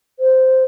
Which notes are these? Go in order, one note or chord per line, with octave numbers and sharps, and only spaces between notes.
C5